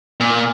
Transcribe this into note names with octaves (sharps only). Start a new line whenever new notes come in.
A#2